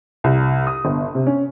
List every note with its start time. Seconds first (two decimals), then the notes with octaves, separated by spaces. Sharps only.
0.24 C2
0.67 D#6
0.85 G1
1.15 C3
1.27 C#4